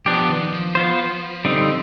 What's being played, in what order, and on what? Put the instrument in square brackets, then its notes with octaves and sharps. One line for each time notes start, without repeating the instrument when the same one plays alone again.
[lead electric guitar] F3 [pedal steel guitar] B3 D4 G4
[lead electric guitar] D#3
F3
[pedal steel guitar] B3 F4 C5
D3 G3 C4 D#4